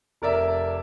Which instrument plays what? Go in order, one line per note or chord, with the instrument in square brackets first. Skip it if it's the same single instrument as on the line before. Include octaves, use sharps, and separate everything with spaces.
[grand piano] F1 A#4 D5 E5